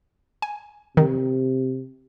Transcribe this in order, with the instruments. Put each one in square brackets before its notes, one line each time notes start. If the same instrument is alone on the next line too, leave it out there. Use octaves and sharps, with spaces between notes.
[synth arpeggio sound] G#5
[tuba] C3 [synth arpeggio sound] D#3